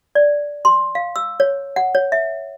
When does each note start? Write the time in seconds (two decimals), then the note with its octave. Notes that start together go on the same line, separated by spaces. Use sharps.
0.15 D5
0.65 C6
0.95 F5
1.16 E6
1.40 C#5
1.76 F#5
1.95 C#5
2.12 E5